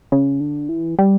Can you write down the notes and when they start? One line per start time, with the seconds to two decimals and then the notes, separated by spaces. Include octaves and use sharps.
0.12 C#3
0.40 D3
0.69 E3
0.99 G3